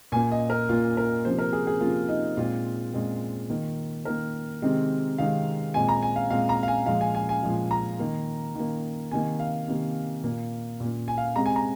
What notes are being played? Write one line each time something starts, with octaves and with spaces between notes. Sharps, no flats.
A#2 A#3 G#5
D#5
A#4
A#2 A#3 F4
A#4
C3 F3 A#3 C5
A#4
G#4
G#4
C3 F3 A#3 F4
D#4
A#2 G#3 C4 F4
A#2 G#3 C4
D#3 A#3
D#3 A#3 A#4
C3 D#3 G#3 C4
C3 D#3 G#3 C4 F5
A#2 G#3 C4 G#5
A#5
G#5
F5
A#2 G#3 C4 F5
A#5
F5
G#5
A#2 F3 G#3 F5
G#5
G#5
G#5
A#2 F3 G#3
A#5
D#3 A#3
D#3 A#3
C3 D#3 A#3 G#5
F5
C3 D#3 A#3
A#2 A#3
A#2 A#3
G#5
F5
C3 G#3 C4 A#5
G#5
A#5